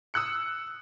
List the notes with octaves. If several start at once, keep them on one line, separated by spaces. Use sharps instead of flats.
D#6 E6 F#6 C#7